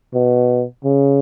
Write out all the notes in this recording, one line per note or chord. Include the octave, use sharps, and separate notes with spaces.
B2
C#3